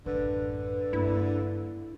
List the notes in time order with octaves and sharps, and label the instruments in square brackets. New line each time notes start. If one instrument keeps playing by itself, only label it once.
[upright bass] A1 F#2 [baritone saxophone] D3 [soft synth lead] B4
[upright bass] G2 A#3 [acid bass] E4